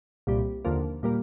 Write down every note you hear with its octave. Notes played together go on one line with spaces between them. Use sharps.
C2 A#2 G3
D#2 D3 F3 A#3
A#2 G3 A#3